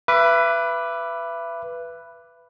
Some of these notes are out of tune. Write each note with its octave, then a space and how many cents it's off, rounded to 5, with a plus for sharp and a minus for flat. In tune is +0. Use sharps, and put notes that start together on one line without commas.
B4 +0 E5 +35 D6 +0